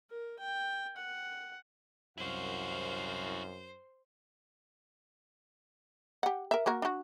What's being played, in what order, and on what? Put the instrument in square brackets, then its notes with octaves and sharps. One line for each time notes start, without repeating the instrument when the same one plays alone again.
[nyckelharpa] A#4
G5
F#5
[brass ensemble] C2 F5 [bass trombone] F#2 [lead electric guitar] E4 F#4 [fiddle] C5
[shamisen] G4 F#5
A#4 E5
A#3 F#4 A#4
D4 F#4